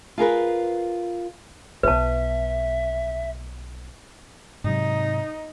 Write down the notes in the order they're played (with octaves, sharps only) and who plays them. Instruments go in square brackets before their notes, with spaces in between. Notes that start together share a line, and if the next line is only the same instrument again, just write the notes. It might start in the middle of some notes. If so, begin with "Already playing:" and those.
[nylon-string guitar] F4 G#4 A#4 B4
[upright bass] B1 F4 [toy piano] B4 A5 [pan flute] E5
[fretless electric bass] G#2 C3 F#3 [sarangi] D#4